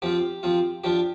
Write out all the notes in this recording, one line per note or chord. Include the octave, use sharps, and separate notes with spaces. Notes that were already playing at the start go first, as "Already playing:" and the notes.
F3 C4 F4 G4
F3 C4 F4
F3 D4 F4 G4